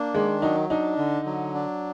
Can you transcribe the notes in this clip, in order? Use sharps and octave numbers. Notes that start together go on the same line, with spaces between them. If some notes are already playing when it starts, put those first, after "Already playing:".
Already playing: A#3 D4
D#3 G#3
F#3 D#4
D4 D#4
D3
F#3
D4